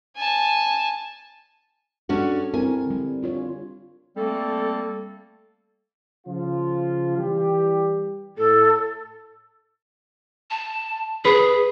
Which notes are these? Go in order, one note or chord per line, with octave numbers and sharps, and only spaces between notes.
G#5 A5
C#4 D4 F#4 G4 A4
C4 E4 A#4 G#5
D3 G3
D4 F4 C#5
G3 A3 A#3 C4 A4
C#3 F3 F4
E3 G3 G4
A2 A4
A5
G#4 B4